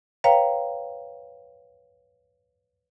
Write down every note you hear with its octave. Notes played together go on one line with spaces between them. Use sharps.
B4 C#5 F5 G5 A#5